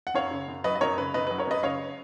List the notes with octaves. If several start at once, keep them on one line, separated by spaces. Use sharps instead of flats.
F#5
F#2 C#5 F5
C#3
F#2
F#3 B4 D#5
D#5
F#2 A#4 C#5
C#3 B4
F#2 B4 D#5
B4
F#3
A#4 C#5
F#2 B4 D#5
C#3 C#5 F5